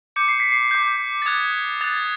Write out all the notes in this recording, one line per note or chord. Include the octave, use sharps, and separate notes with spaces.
D6 G6 C#7
C7
B6
C7
D6 G6
A6
D#6 F#6 G#6
D#6 F#6 A6
G#6